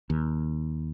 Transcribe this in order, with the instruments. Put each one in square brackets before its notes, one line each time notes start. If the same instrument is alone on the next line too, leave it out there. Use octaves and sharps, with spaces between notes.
[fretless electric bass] D#2